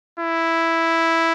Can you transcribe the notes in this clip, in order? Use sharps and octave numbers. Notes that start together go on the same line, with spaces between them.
E4